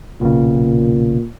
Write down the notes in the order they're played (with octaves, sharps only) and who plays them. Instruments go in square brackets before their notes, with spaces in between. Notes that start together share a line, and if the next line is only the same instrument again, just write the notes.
[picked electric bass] B1 C#3 [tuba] A#2